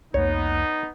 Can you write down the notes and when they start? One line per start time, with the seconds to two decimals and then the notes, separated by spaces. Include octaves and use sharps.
0.14 C2 F2 A#3 B3 D#4 C#5